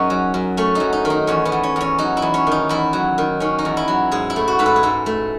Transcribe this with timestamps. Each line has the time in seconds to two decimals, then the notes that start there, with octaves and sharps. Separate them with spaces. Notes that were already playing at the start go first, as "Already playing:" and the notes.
Already playing: F#2 C#4 D#4 F#4 G#4
0.10 F#3
0.34 F#2
0.57 A3 C#4
0.75 F#3 D#4
0.93 D#4
1.05 D#3
1.10 D#4
1.27 E2 C#4
1.45 B3
1.52 E2
1.63 C#4
1.76 E2 C#4
1.99 F#3 D#4
2.17 E4
2.22 E2
2.34 C#4
2.47 D#3 D#4
2.69 E2 E4
2.93 F#3
3.18 D#3
3.40 D#3 C#4
3.59 D#4
3.65 E2
3.77 E4
3.88 F#3
4.11 G#2 G#4
4.30 E4
4.36 A3
4.48 F#4
4.59 G#2 B4
4.66 A4
4.76 G#4
4.83 G#2 A4
5.06 A3